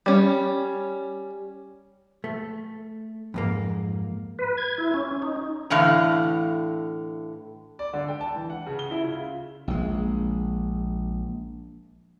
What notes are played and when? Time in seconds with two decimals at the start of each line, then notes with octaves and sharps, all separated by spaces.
0.06 G3 C#4
2.24 A3
3.34 F2 G#2 A#3
4.39 B4
4.57 G#6
4.78 E4
4.94 C#4
5.22 D#4
5.70 A2 D3 E3 F5
7.79 D5
7.93 D3
8.08 G5
8.21 A5
8.34 E3
8.50 F#5
8.66 C#3
8.79 G7
8.91 E4
9.03 C#3
9.15 F4
9.68 A#1 G#3